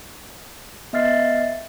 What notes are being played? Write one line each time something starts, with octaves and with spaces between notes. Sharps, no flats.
B3 D#5 E5 F6 A6 C7